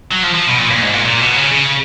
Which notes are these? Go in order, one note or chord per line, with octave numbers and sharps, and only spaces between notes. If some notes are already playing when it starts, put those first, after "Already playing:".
F#3
F3
F3
B2
A#2
A#2
G#2
A#2
A#2
B2
C#3
C#3